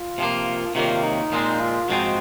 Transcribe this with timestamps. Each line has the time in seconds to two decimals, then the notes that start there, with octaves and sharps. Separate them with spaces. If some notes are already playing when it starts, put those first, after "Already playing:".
Already playing: F4
0.18 C3 F3 A#3
0.75 C3 D#3 F#3 A#3 F4
1.03 D#4
1.32 A#2 F3 G#3 C4
1.60 F4
1.89 G#2 F3 C4 D#4 F#4